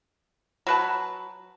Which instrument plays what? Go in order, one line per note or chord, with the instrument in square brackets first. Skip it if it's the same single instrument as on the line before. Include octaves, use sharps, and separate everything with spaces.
[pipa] F#3 B4 A5